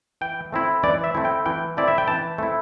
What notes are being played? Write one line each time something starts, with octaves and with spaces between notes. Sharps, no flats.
E3 G5
A3 C4 E4
E3 D5
E5
A3 C4 E4
G5
E3 G5
A3 C4 E4 D5
E5
G5
E3 A5
A3 C4 E4